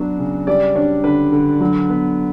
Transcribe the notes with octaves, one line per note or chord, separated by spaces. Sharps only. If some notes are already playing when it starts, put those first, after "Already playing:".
Already playing: F#3 B3 D4 F#4
C#3
G3 D5
D4 C#5
D3 B4
D3
F#3
B3